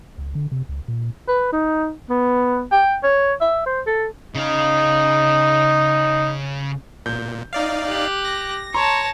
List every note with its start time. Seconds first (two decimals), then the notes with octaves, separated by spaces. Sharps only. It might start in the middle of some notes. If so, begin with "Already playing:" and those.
0.18 C#2
0.35 D3
0.52 C3
0.69 C#2
0.88 A#2
1.28 B4
1.52 D#4
2.09 B3
2.72 G5
3.03 C#5
3.41 E5
3.66 C5
3.86 A4
4.35 C#3 D#4 F5
7.06 A#2 G6
7.53 D#4 D5 F5
7.86 G4 F#6
8.25 A#6
8.74 C#5 A5 A#5 C6 C#6